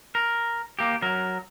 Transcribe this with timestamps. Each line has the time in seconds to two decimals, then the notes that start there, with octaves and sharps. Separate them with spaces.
0.15 A#4
0.79 A#3 G4
1.02 F#3 A#4